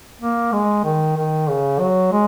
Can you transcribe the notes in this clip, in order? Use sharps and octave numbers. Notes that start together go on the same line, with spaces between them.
A#3
G#3
D#3
D#3
C#3
F#3
G#3